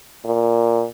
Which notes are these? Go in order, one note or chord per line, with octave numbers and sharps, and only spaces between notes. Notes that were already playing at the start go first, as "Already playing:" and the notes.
A#2